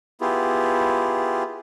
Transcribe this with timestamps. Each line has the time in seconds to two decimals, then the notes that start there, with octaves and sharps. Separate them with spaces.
0.21 B3 E4 F4 G4 G#4